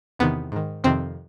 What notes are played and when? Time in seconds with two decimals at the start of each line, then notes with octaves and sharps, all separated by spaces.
0.19 E2 C3 D#3 B3
0.52 G#2 D#3
0.84 F2 C3 D#3 C4